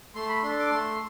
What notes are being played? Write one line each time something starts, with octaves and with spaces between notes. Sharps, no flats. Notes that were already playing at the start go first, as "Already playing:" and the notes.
A3 C6
B5
D4 A4 C6
D6
A3 C6